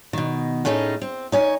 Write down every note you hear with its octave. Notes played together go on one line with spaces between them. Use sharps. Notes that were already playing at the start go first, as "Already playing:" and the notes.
B2 D#3
A2 A3 C#4 D#4 G#4
C4
D#4 C#5 G#5